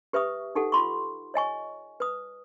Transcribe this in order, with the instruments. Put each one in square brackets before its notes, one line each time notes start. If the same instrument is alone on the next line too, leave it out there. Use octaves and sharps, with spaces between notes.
[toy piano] G4 B4 E5 C#6 D#6
D#4 G4 A4 F#5
F4 C6 C#6
C#5 D#5 G#5 C#6
B4 D#6